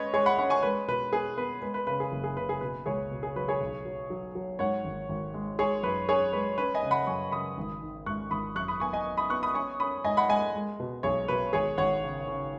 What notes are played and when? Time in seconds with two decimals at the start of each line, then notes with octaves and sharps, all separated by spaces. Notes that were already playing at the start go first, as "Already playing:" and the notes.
Already playing: G#3 C#4 B4 C#5 D#5
0.13 G#3 G#4 C#5
0.26 F#5 B5
0.39 C#4 F#5 B5
0.50 G#5 C#6
0.63 G#3 B4
0.88 B2 B4
1.12 B3 G#4
1.37 B3 B4
1.62 G#3 B4
1.74 B4
1.87 C#3 B4
2.00 G#4
2.12 F#1
2.24 G#4
2.37 C#3 B4
2.49 G#4
2.61 B2 B4
2.86 C#2 G#4 C#5
3.11 B2
3.23 G#4
3.36 F#3 B4
3.48 G#4 C#5
3.61 B1
3.85 F#3
4.10 F#3
4.35 F#3
4.59 G#2 C#5 F#5
4.85 G#1
5.09 G#1
5.34 G#3
5.58 G#3 G#4 C#5
5.83 F#2 B4
6.08 C#4 G#4 C#5
6.33 G#3 B4
6.58 C#4 B4
6.75 D#5 G#5
6.83 C#3
6.91 F#5 B5
7.07 F#2 G#5 C#6
7.32 C#3 B5 D#6
7.58 G#1
7.82 D#3
8.06 G#2 C#6 F#6
8.31 G#1 B5 D#6
8.56 F#2 C#6 F#6
8.68 B5 D#6
8.80 B3 G#5 C#6
8.93 D#5 G#5
9.05 B3
9.17 B5 D#6
9.30 B3 C#6 F#6
9.43 B5 D#6
9.55 C#4 G#5 C#6
9.80 C#4 B5 D#6
10.04 G#2 D#5 G#5
10.17 F#5 B5
10.29 G#3 D#5 G#5
10.55 G#3
10.80 B2
11.03 B1 G#4 C#5
11.28 B2 B4
11.53 G#1 G#4 C#5
11.78 G#1 C#5 F#5
12.04 C#3
12.28 C#3